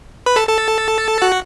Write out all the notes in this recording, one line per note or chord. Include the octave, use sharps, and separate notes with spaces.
B4 B5
A4 A5
A4 A5
F#4 F#5